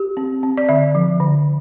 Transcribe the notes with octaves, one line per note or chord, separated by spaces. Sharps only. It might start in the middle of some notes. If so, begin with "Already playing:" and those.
Already playing: G4
C4
C4
D5
D3 E5
F3
D3